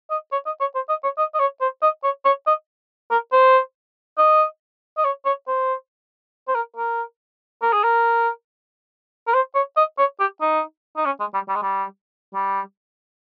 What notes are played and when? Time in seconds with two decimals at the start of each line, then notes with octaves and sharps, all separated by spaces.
0.11 D#5
0.32 C#5
0.46 D#5
0.61 C#5
0.75 C5
0.89 D#5
1.04 C#5
1.18 D#5
1.35 D#5
1.39 C#5
1.61 C5
1.82 D#5
2.04 C#5
2.25 C#5
2.47 D#5
3.11 A#4
3.32 C5
4.18 D#5
4.98 D#5
5.05 C#5
5.26 C#5
5.48 C5
6.48 C5
6.55 A#4
6.76 A#4
7.62 A#4
7.73 G#4
7.84 A#4
9.28 A#4
9.34 C5
9.55 C#5
9.77 D#5
9.98 C#5
10.20 G4
10.41 D#4
10.97 D#4
11.06 C#4
11.20 G#3
11.34 G3
11.49 G3
11.56 G#3
11.63 G3
12.35 G3